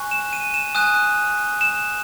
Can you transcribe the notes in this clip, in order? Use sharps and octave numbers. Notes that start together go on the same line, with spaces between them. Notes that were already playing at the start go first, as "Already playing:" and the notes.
Already playing: G#5 C#6 F#6
E7
D#7
E7
G#5 D#6 F#6
E7